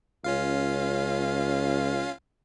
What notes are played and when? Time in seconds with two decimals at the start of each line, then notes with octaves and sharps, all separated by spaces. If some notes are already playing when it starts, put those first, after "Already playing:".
0.24 C#2 C#4 F4 F5